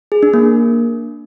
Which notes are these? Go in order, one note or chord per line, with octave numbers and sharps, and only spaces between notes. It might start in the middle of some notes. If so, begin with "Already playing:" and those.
G#4
D4
A#3